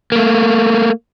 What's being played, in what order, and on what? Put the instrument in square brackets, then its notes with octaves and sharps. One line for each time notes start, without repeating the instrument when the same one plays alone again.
[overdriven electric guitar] A3 A#3